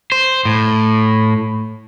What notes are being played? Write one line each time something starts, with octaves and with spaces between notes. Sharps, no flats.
C5
A2